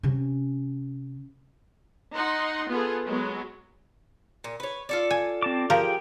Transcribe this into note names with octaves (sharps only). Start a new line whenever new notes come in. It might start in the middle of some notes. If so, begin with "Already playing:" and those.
C3 C#4
D#4 F#5 C6
B3 F4 G#4 A4
F#3 G#3 B3
A#2
B4 C#5
F4 A4 D5
G#5
C4 A5 D6
F3 G4 G#4 A#4 G5